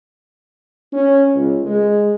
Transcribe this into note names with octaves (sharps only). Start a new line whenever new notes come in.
C#4
C#2
G#3